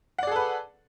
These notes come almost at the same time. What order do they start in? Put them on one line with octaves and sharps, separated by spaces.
F#5 D5 G#4 A4 B4